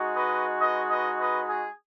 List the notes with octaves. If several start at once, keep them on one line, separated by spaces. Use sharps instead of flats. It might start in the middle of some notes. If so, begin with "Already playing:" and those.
Already playing: G#3 D#4 F#4
B4 D#5
B4 D#5
B4 D#5
B4 D#5
G#4